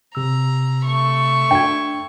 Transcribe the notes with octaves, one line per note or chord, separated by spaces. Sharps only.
C3 A#5 E6
A3 C#6
D4 G5 G#6